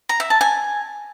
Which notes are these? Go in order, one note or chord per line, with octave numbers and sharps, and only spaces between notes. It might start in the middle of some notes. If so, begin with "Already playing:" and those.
A#5
E5
A5
G#5